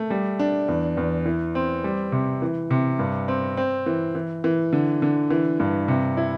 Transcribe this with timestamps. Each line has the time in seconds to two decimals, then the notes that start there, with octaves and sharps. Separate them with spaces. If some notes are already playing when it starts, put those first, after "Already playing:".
Already playing: A3
0.10 G3
0.39 D4
0.68 E2
0.97 E2
1.26 E3
1.55 C4
1.84 G3
2.12 C3
2.42 E3
2.71 C3
2.99 G2
3.28 C4
3.57 C4
3.86 E3
4.15 E3
4.44 E3
4.73 D3
5.02 D3
5.30 E3
5.60 G2
5.88 C3
6.17 E4